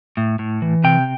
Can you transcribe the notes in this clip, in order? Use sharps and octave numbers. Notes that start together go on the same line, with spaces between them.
A2
A2
E3
C3 G5